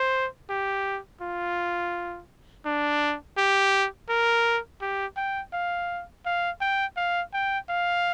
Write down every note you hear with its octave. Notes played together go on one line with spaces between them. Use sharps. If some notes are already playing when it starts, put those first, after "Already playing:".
Already playing: C5
G4
F4
D4
G4
A#4
G4
G5
F5
F5
G5
F5
G5
F5